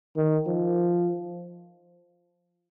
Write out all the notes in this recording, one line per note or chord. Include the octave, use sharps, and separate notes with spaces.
D#3
F3